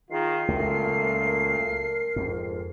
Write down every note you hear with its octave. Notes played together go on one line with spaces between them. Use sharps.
D#3 F4 G#4 C7
C#2 F#2 A#2 A3 A#4
F2 G#2